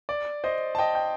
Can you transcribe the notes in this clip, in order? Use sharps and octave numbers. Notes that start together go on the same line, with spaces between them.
D5
C5 D#5
A5
D#5 G5
G5